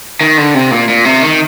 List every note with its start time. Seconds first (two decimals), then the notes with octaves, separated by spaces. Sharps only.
0.21 D#3
0.37 D3
0.55 C3
0.71 A#2
0.89 A#2
1.05 C3
1.22 D#3